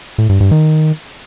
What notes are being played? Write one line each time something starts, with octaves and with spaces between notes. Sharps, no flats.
A2
G2
G2
D#3